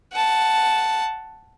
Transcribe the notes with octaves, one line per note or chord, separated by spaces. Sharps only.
F#5 A5